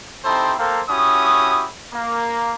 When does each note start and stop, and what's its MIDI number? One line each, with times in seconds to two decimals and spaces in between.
0.25 0.54 60
0.25 0.54 63
0.25 0.54 64
0.25 0.54 67
0.25 0.54 69
0.25 0.54 72
0.59 0.81 58
0.59 0.81 69
0.59 0.81 72
0.59 0.81 77
0.59 0.81 79
0.59 0.81 82
0.89 1.68 61
0.89 1.68 64
0.89 1.68 66
0.89 1.68 67
0.89 1.68 87
1.93 2.54 58